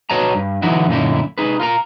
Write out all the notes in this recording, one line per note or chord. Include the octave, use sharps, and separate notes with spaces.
F#4 B4 C#5 D#5 A5 A#5
G2
D3 E3 F#3 D#4 E4 F#4
F#2 A#2 D3 D#4 E4
D#4 G#4 B4
F4 A#4 A#5